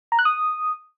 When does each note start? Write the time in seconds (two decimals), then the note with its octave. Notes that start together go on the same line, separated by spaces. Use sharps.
0.12 A#5
0.19 F#6
0.25 D#6